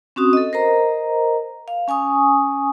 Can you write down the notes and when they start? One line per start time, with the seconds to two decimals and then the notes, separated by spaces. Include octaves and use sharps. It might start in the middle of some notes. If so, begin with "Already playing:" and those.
0.16 C4 C#4 F#4 D#6
0.33 A4 D#5
0.53 A#4 C5 D#5 A#5
1.68 F5
1.88 C#4 G#5 C#6 D#6